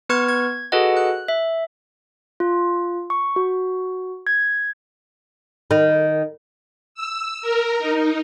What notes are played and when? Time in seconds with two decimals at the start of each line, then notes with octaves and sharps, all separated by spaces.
0.09 B3 B4 C#6 F6 G#6
0.29 G#6
0.72 F#4 G#4 A4 B4 D#5 F#5
0.97 F#6
1.28 E5
2.40 F4
3.10 C#6
3.36 F#4
4.27 G#6
5.71 D#3
6.95 E6
7.42 A#4
7.79 D#4